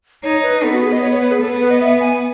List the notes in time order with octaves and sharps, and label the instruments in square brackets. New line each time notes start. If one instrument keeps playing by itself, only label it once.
[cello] D#4 [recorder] C#5
[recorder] B4
[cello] B3 [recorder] A4
[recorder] F#4
G#4
D#5
C#5
C#5
B4
G#4
[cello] B3 [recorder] A4
[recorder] B4
D#5
E5
G#5